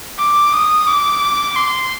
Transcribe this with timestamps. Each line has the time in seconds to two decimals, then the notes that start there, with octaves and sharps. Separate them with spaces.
0.19 D6
0.53 D#6
0.87 D6
1.56 C6